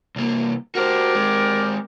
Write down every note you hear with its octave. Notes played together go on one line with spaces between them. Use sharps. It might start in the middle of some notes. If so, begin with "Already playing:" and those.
C2 A#3
F#4 G4 A#4 C5 D5
G#3 C4